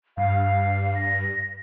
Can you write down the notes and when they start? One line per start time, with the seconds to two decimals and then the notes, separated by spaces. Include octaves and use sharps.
0.17 G2 F5
0.95 A#6